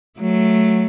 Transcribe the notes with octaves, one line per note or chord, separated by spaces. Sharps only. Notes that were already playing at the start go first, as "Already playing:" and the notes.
F#3 A3